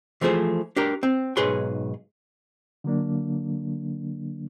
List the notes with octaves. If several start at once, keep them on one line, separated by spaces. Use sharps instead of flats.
E3 F3 A3 G#4 C5
D4 G4 A#4
C4
B1 G#2 G#4 B4 C#5 C6
D3 F#3 A#3 D4